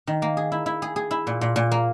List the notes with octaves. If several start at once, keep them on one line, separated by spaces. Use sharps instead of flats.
D#3
A#3
G#4
E4
E4
G#4
G#4
E4
A#2
A#2
A#2
A#3